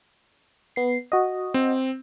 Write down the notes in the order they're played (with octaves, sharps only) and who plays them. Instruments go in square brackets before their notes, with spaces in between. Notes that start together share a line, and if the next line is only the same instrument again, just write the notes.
[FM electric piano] B3 C7
F#4 D#5
[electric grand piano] C4